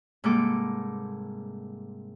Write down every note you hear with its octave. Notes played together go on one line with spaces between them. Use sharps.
G#2 C3 G3 A#3 A4 D6